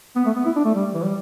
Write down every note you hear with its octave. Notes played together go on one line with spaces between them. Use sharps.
B3
A3
B3
E4
D4
A3
G3
E3
G3